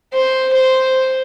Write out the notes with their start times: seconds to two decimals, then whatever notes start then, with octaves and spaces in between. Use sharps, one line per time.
0.14 C5
0.54 C5